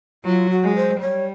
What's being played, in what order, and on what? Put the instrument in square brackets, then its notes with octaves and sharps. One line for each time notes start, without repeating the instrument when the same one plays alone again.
[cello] F#3 [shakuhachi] F4
[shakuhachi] F#4
[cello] G#3
[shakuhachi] C5
[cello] G3 [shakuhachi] C#5